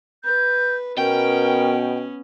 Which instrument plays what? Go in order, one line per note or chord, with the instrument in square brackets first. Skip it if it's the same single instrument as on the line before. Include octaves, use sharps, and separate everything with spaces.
[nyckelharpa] B4 [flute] G6
[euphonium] B2 [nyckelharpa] B3 C#4 [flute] A#4 [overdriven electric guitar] G5